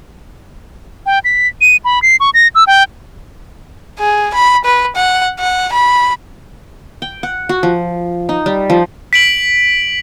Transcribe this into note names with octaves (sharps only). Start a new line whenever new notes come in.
G5
B6
D#7
B5
C7
C#6
A#6
E6
G5
G#4
B5
B4
F#5
F#5
B5
G5
F#5
F#4
F3
D#4
G3
F3
B6 D7 F#7